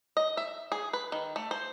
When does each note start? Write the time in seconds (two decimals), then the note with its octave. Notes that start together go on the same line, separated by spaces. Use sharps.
0.17 D#5
0.37 E5
0.72 G#4
0.93 B4
1.12 D#3
1.36 A3
1.51 C5